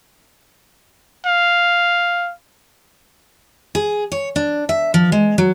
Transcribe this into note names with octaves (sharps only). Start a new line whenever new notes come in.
F5
G#4
C#5
D4
E5
F3
G#3
F#3